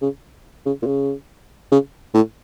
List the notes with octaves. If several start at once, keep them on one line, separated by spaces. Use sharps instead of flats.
C#3
C#3
A#2
C#3
C#3
A2